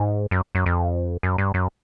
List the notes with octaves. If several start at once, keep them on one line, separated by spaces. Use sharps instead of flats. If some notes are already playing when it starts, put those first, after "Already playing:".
Already playing: G#2
F#2
F#2
F2
F#2
G2
F#2